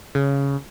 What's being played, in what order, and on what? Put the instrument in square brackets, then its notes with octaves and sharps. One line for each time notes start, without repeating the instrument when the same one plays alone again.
[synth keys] C#3